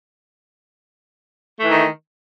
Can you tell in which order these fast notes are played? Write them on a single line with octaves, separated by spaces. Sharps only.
A3 E3 D#3